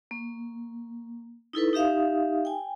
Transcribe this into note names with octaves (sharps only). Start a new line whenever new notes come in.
A#3
D#4 E4 A4 B4
D#4 G4 E5 F5 D#6
G5 G#5